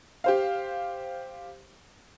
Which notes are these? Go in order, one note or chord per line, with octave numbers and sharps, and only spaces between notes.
G4 C5 F5